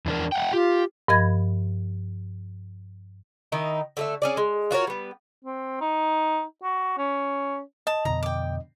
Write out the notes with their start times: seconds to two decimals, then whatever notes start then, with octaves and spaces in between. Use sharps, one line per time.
0.06 E2 D4 A#4
0.32 E5 F#5 G5
0.53 F4 G4
1.08 G2 F3 A#4 D#5 B5 G#6
3.52 D#3 D#4 E4
3.97 D3 A3 E5
4.22 C#4 G#4 D5
4.37 G#3
4.71 F4 F#4 A#4 C#5
4.87 G3 B3
5.44 C4
5.81 D#4
6.63 F#4
6.98 C#4
7.87 D#5 A5
8.05 F2 B2 D3 A#5
8.23 G5 D6